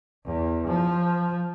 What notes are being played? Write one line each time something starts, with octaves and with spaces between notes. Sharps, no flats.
E2
F3